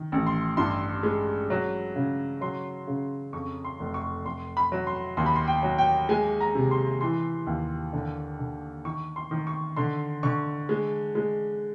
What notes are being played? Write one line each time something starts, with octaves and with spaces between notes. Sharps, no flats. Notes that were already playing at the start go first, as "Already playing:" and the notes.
Already playing: D#3
A1
C6
G2 C6
G#3
F#3
C#3
F#3 C6
C#3
F2 C#6
C6
F1
C#6
F1 C6
B5
F#3
C6
D#2 C6
B5
C6
G5
F#3
G5
G#3 G#5
A#5
C3
C6
E3 C6
D#2
D3
D3
D#3 C#6
C6
D#3
C#6
D3 C6
D3 C#6
G#3
G#3